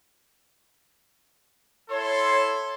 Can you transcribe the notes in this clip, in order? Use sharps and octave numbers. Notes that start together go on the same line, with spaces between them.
E4 A4 C#5 C6